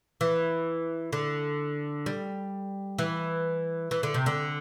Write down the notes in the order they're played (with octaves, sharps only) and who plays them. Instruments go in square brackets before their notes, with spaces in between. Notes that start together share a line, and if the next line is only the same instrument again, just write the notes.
[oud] E3
D3
G3
E3
E3
D3
C3
D3